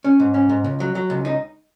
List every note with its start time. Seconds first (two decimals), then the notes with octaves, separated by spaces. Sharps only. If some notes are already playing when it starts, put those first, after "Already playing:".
0.04 C#4
0.20 G#2
0.34 C#4
0.49 G#2
0.64 C#2
0.80 F#3
0.95 F#3
1.10 C#2
1.25 D#4